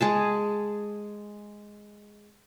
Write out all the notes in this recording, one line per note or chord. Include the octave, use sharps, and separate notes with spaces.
G#3 G#4 A5